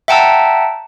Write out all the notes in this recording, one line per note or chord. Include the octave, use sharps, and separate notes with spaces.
E5 F#5 G5 A5 A#5 E6